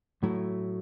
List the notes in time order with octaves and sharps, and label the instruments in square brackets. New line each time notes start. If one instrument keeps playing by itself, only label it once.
[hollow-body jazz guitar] A2 F#3 A3 E4